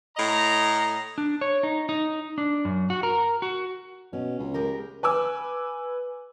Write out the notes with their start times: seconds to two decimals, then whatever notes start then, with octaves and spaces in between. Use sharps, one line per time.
0.17 A2 D#5 A#5
1.18 D4
1.41 C#5
1.63 D#4
1.89 D#4
2.38 D4
2.65 F#2
2.90 F#4
3.03 A#4
3.42 F#4
4.13 B2 C#4
4.39 C#2
4.54 G#3 G4 A#4
5.03 B4 G#5 D6 E6